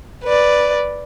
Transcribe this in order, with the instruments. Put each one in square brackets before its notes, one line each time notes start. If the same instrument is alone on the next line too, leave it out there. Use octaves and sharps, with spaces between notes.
[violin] B4 D5